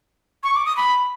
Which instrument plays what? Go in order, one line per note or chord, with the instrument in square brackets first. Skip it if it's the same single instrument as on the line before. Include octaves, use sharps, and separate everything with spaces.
[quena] C#6
D6
D#6
B5